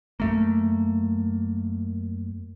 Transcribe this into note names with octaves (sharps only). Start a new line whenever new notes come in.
F#2 A3 A#3